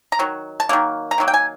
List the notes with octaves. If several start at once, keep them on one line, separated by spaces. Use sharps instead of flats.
A#5
D#3 F#3
A5
D#3 F#3 A#3
A#5
D#3 F#3 A#3
G5
G#5